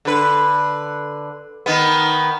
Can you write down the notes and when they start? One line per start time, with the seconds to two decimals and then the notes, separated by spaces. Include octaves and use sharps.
0.05 D3 B4
1.66 D#3 B3